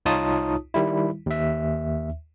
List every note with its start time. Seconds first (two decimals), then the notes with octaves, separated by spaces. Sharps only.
0.05 C2 D#4 F4 C#5 A5 D#6
0.74 D#3 G3 E4
1.26 D#2 E5